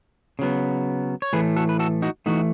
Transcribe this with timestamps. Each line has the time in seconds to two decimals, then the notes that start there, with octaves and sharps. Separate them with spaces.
0.39 C#3 F#3 B3
1.22 C#5
1.33 A2 E3 A3 G#4 B4
1.56 F#4 A4
1.69 B4
1.79 F#4 A4
2.02 D#4 F#4
2.26 E3 A3 D#4 F#4